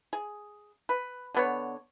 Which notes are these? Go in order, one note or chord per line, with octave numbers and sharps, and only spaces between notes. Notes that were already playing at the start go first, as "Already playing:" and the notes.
G#4
B4
D3 B3 C#5